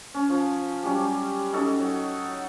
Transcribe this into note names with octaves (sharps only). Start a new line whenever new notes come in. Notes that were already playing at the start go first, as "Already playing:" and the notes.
C#4
F3
F#3 G3 C#4 G4
C#4 D#4 F#4 A4
F#3